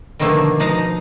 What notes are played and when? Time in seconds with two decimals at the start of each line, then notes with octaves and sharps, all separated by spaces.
0.20 B2 D3 D#3 F3 A3 A#3
0.59 B2 F3 D#4 F5 A#5